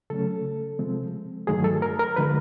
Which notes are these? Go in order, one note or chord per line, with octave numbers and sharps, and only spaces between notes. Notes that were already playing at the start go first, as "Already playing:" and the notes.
C#3 F#3 A3 C#4 A4
C3 F3 G#3 C4
G2 D#3 F#3 A3 G#4
A4
A#4
A#4
D3 F3 G#3 B4